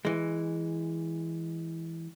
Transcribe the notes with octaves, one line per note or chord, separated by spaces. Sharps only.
E3 G#3